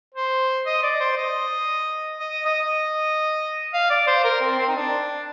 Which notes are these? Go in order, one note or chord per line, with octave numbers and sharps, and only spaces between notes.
C5
D#5
D5
C5
D#5
D#5
D#5
F5
D5
C5
A#4
C4
C4
D#4
D4